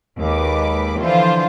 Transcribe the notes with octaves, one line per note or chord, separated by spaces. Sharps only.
D#2 G#3 B4 D6
D3 E3 F3 F4 C5